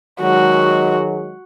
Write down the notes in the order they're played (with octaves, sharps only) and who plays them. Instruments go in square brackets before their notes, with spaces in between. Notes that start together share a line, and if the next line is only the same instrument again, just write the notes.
[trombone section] D#3 F#3 G#3 [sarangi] F#4